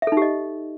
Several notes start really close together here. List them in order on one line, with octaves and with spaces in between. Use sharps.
E5 A4 D#4 G4 D#5